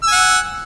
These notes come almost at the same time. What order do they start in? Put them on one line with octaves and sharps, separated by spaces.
E6 G#5 F#5